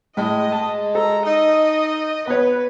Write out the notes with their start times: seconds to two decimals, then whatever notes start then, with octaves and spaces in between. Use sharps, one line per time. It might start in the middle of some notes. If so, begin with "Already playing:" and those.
0.17 A2 G#3 D#5
0.52 G#3 A5
0.95 A4 A#5
1.26 D#4 D#5
2.27 B3 B4 C#5